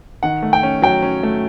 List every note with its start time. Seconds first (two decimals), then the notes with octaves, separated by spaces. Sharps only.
0.23 D#3 F#5
0.43 A3
0.53 G5
0.63 C#4
0.82 F#3 G5
1.02 C#4
1.23 A3